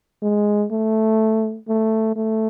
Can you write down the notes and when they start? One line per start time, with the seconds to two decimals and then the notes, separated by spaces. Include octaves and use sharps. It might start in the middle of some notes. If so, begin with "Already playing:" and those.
0.22 G#3
0.71 A3
1.68 A3
2.16 A3